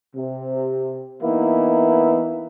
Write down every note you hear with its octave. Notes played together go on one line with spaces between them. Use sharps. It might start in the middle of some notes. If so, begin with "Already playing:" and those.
C3
E3 A#3 B3 D#4 E4